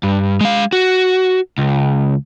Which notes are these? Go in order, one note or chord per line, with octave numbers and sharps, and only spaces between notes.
G2
G#3 F5
F#4
C#2